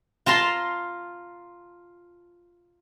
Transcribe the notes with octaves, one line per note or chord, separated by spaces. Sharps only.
F4 A5 A#5 C6